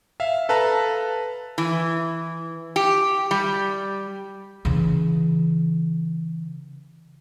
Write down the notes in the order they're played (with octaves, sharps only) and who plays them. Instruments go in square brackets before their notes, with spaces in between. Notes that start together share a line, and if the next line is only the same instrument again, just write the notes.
[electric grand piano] E5 F5
A4 B4 F5 A5 A#5
[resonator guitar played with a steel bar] E3
G4
G3
[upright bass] C#3 E3